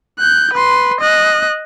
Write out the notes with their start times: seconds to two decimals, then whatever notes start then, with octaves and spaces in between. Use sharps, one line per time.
0.20 F#6 G6
0.53 B4 C6
1.00 D#5 F#6